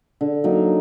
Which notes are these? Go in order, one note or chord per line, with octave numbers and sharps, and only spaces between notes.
D3
F#3 A#3 D#4